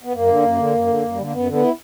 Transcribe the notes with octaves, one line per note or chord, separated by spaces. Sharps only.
B3
F#2 A#3
D3
F#2
D3
F#2
D3
F#2
G3
D3 A#3
F#2 B3
D3
B3
E4